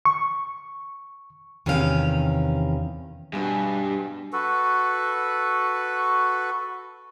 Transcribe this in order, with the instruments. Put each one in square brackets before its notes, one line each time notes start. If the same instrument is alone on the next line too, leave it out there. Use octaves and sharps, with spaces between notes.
[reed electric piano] C#6
[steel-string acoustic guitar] E2 C3 D#3 C#4 G4 F5
[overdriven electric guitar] G2 [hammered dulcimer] B2 G#5
[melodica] F#4 A4 B4